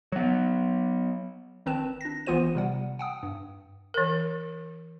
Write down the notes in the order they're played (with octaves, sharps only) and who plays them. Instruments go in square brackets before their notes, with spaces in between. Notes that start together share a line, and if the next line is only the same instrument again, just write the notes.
[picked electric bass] F#3 B3
[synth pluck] G#1 D#3 C4 B4 A5 E7
D4 A#6
G#1 E3 B3 F4 C5 D#7
C3 G3 F#5
F#5 G5 D#6
G2
[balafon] E3 A#4